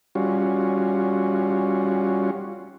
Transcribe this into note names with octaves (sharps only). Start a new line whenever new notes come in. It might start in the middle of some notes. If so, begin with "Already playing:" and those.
G3 C#4 F4 F#4